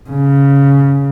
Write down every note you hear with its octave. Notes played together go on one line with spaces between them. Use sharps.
C#3